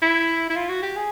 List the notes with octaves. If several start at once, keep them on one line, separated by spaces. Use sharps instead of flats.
E4
E4
F4
F#4
G4
G#4